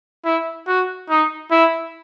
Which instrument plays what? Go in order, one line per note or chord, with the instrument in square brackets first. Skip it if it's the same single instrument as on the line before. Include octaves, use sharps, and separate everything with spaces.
[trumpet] E4
F#4
D#4
E4